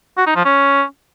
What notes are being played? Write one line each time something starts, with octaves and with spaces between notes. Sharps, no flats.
F#4
D#4
F3
C#4